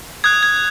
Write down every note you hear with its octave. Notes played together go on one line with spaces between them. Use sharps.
D#6 F#6 G#6
G#6